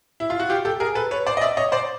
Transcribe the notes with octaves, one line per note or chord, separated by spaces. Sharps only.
E4
F4
F#4
F4 G4
G4 A4
G#4 A#4
A4 B4
B4 C#5
C5 D5
D#5
D5 E5
C#5 D#5
C5 D5